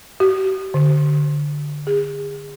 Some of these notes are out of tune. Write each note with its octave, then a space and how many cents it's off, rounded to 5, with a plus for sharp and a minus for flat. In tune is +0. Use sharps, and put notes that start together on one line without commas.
G4 -45
D3 +0
G#4 -35